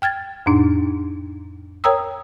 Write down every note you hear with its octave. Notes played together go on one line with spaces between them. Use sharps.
G5 F6 G#6 A6
F2 A2 D4 D#4
A#4 C#5 G5 A#5 D#6 E6